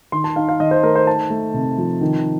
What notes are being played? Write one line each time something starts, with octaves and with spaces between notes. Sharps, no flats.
D#3 C6
A5
D#4 F5
F5
D#3 D#5
C5
A3 A#4
C5
D#4 A5
A3
C3
F3
D#3